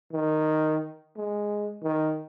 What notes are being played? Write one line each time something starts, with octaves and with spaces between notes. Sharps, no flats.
D#3
G#3
D#3